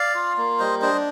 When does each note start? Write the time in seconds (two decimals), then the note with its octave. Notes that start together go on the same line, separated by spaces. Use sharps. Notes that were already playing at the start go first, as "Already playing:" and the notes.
Already playing: D5 F5
0.15 F4
0.38 A#3
0.59 G3 C5 D#5
0.82 D4 C5 D#5